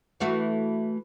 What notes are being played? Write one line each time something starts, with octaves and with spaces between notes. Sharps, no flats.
E3 A3 F#4